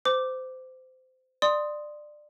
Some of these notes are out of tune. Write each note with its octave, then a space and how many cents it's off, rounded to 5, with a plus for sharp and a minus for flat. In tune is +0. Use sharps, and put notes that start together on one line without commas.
C5 -25 D6 +0
D5 +20 C6 +0 D#6 +0